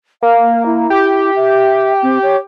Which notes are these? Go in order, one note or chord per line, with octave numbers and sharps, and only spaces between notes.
A#3 F5
E4
G4
E5
C4
C#5